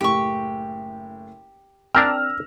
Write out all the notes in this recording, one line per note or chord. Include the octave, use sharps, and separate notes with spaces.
F#1 A2 G4 C#6
C4 D4 A#4 G5 E6 F6 A#6